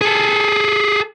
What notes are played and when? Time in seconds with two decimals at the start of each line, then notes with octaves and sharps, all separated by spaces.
0.01 G#4 A4